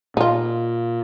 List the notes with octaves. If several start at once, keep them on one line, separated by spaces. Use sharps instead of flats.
A#2 D#4 F4